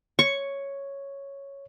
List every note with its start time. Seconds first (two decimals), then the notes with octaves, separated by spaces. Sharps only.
0.19 C#5 C#6